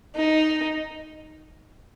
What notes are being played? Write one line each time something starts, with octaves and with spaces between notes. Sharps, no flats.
D#4